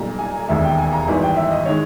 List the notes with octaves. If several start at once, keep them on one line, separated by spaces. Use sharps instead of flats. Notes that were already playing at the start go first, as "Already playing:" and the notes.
Already playing: B1 A#2 G3 A#5
G#5
E1 D#2 D#3 G#3 E5
G5
G#5
A#5
G#1 G#2 E3 G3
G5
E5
D#5
D#3 G#3 C#5